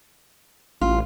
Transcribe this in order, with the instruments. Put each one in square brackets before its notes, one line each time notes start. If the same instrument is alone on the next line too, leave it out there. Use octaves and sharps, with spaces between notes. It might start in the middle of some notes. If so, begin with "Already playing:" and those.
[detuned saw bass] A1 [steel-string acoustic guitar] F4